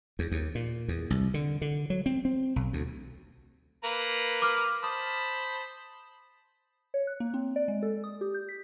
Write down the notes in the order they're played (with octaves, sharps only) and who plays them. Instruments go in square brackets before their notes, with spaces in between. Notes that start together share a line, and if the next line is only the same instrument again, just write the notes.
[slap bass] E2
D#2
A#2
E2
C2
D3
D3
F#3
C4
C4
B1
D2
[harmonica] A#3 B4 A#5
[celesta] D6 F6
[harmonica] C5 A5 B5 [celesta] D#6
[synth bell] C#5
F#6
A#3
C4
D5
G#3
A4
D#6
G4
G6
B6